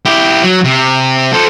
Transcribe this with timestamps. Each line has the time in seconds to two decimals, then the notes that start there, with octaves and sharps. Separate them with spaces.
0.05 E4 G4
0.43 F#3
0.64 C3
1.33 A4 C5